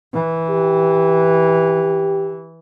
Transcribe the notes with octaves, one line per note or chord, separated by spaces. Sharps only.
E3
G4